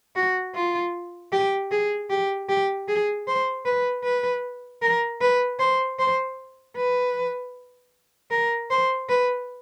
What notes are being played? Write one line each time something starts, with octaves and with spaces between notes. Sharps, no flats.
F#4
F4
G4
G#4
G4
G4
G#4
C5
B4
B4
A#4
B4
C5
C5
B4
A#4
C5
B4